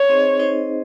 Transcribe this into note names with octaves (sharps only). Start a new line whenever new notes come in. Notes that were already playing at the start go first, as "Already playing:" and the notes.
Already playing: C#5
C4 D#4 G#4 C5 D#5
C4 D#4 G#4 C5 D#5